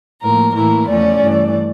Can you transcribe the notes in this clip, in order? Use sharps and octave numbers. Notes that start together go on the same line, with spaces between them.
A2 F3 A#3 A#4
A2 E3 A#3 E4 A#4
E2 C#3 F3 A3 C#4 D5
G2 E3 A3